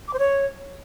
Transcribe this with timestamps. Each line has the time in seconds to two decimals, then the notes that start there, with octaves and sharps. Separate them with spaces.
0.08 D6
0.13 C5
0.19 C#5